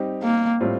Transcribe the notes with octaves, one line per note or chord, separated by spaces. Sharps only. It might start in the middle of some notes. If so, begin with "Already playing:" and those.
Already playing: G3 C4 D#4 G4
A#3
A2 G3 C4 F4